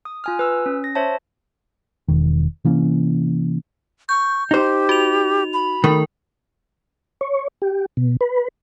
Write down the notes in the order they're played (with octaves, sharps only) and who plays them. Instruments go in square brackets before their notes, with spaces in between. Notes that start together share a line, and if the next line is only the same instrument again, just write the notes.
[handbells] D#6
F4 G#5 F6
B4 E6
C#4
A#6
C5 C#5 E5 A5
[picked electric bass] E1 D#3
C3 E3 A#3 C#4
[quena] C#6 [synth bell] G6
[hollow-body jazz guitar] D#4 C5 [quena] G4
[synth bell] F#4 F7
[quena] B5
[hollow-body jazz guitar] D#3 A3 [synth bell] A#4
[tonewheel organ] C#5
G4
B2
B4